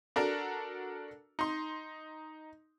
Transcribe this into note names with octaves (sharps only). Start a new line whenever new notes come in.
D4 F#4 A4 A#4
D#4 C6